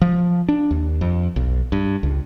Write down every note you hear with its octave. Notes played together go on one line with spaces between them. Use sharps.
F3
D4
D#2
F2
B1
G2
C#2